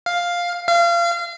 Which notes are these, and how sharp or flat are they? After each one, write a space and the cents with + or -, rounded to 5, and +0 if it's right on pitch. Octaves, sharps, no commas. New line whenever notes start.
F5 +5
F5 -30